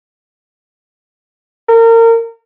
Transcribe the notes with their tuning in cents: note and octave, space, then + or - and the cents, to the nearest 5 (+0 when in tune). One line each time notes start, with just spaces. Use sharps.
A#4 -30